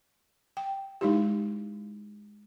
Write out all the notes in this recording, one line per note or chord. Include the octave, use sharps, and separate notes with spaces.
G5
G#3 D#4 E4 G4